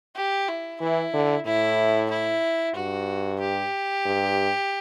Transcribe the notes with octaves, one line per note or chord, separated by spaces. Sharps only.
G4
E4
E3 E4
D3
A2 E4
E4
G2 F#4
G4
G2